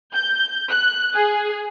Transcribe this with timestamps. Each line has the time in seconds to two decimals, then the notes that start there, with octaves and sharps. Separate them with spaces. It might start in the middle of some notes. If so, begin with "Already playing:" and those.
0.14 G6
0.69 F#6
1.14 G#4